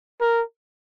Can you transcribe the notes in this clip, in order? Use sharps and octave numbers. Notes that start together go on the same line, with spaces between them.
A#4